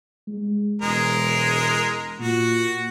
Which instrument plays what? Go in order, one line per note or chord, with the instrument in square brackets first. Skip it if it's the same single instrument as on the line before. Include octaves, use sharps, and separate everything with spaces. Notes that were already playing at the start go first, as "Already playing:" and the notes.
[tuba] G#3
[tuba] E1 [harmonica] G#3 A#4
[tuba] A#2 [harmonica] F#4